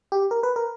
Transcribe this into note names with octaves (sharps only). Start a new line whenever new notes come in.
G4
A#4
B4
A#4